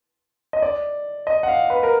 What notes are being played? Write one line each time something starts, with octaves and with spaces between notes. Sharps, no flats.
D#5
D5
D#5
F#5
F5
B4
A#4